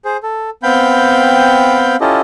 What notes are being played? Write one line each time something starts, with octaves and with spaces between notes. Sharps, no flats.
G#4 C5
A4
B3 C4 F5 G5 B5 G6
C#4 E4 F4 G4 A4 D#5